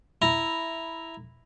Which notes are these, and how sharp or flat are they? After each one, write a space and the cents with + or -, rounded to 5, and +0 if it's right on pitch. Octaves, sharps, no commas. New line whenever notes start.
E4 +0 A#5 +0